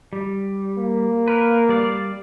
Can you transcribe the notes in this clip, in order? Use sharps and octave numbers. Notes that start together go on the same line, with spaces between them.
G3
A#3
A#4 B4
G3 D5 F5